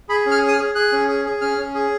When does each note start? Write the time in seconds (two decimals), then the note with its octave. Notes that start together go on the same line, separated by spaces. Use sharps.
0.09 G#4 B5
0.26 C#4
0.31 F6
0.42 G#4
0.48 D#6
0.53 F6
0.59 G#4
0.75 G#4 F#6
0.92 C#4
1.08 G#4
1.25 G#4
1.41 C#4 F6
1.58 C#4
1.74 G#4